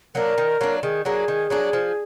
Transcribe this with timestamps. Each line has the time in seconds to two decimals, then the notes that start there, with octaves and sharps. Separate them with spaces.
0.15 F#3 A#3 D4 A#4
0.38 D#3
0.61 F#3 A#3 D4
0.83 D#3 G#4
1.05 F#3 A#3 D4 G#4
1.28 D#3
1.50 F#3 A#3 D4
1.73 F3